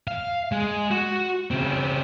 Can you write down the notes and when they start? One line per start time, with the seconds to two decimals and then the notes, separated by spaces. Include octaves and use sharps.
0.08 F5
0.52 G#3
0.91 F#4
1.51 C#3 C4